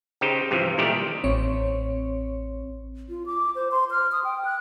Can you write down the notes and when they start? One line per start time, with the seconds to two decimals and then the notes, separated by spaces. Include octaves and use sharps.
0.21 C#3 D#4 G4 C5
0.51 G2 C3 E3 F3
0.78 A#2 D#3 G3 A3 E4 G4
1.24 A1 C4 C#5
3.09 F4
3.26 D6
3.55 C5
3.71 C6
3.91 F6
4.12 D#6
4.24 G5
4.45 F#6